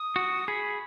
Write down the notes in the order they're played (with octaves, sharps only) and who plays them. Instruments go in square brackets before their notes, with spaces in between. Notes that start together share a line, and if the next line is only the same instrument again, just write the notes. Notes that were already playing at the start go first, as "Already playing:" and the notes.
Already playing: [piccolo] D#6
[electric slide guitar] F#4
[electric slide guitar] G#4 [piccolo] B5